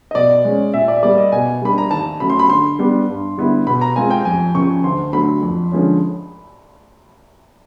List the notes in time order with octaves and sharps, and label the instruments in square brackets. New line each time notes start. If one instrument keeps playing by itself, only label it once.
[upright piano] D#5
[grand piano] B2 [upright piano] D5
[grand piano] G#3 C#4
[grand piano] A#2 [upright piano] E5
[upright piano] D5
[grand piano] G3 A#3 [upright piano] D5
[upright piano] D#5
[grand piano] B2 [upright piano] G#5
[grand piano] G3 A#3 D4 [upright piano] B5
[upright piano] A#5
[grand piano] D#2 [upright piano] A5
[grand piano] C#3 F#3 A3 [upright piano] B5
[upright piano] C6
B5
[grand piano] D3 [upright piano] C6
[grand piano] G3 B3 D4
G2
D3 G3 B3 E4
[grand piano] B2 [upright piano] B5
[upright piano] A#5
[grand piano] G#3 C4 F4 [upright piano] G#5
[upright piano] G5
[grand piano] F2 [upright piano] G#5
[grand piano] C#3 F3 [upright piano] C#6
[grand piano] D2 [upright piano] C6
[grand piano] D3 F#3 A3 [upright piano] B5
[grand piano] F2
D3 F3 G#3 C#4